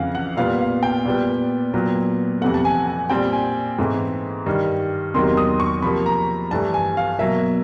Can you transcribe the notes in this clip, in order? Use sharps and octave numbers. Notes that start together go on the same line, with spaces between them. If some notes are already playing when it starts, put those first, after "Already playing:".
Already playing: F2 C#3 E3 F5 F#5
F#5
A#2 G3 B3 F5
F5
G5
A#2 G3 B3
A#2 F#3 B3
F2 C3 E3 A3 F#5
A5
G#5
G#5
A#2 G3 C4 G5
G#5
G#2 E3 A3 C4
G2 D#3 G3
E2 C3 D#3 F#3 A#3 C6
D#6
C#6
C3 F3 A#3 B5
A#5
G2 E3 A3 A5
G#5
F5
B2 F#3 A#3 E5